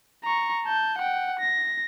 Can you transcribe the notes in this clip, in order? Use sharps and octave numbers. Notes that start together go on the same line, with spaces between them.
A#5 C#6
A5 G6
F#5 G5
A#6